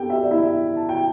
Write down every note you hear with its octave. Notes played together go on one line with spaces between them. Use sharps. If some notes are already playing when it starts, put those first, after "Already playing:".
Already playing: B3 G4 A4 G5
E5
D5
E4 E5
A5
G5